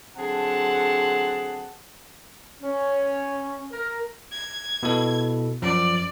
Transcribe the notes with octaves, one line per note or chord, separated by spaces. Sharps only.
D3 F#3 C4 G#4 F#5 A5
C#4
A#4
G#6
B2 E4 A4
F#2 F3 D5